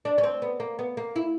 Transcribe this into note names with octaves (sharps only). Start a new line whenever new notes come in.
D4
C#4
C4
B3
A#3
B3
A#3
E4